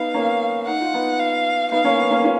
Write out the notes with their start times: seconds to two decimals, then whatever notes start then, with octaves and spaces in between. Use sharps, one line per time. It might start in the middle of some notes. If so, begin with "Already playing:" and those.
Already playing: B3 D#4 F5
0.14 A#3 C#4
0.66 D#4 F#5
0.80 F4
0.94 B3 D#4
1.19 F5
1.72 B3 D#4 F5
1.85 A#3 C#4
1.98 B3
2.11 A#3 C#4
2.24 C#4 F4